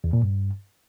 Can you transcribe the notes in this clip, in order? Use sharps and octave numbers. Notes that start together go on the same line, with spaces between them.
E2
A#2
G2